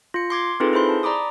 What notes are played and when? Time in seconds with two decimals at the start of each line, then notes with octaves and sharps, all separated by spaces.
0.14 F4 C#7
0.30 C6 D6 G#6 C7
0.60 C4 D#4 F4 G#4 A4 B4
0.73 E4 G#4 C5 B5 C6
0.89 A5
1.03 D5 A#5 B5 D6 D#6